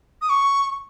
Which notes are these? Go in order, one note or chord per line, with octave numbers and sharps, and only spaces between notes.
D#6
C#6